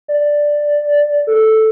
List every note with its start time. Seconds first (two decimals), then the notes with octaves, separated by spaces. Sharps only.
0.08 D5
1.27 A4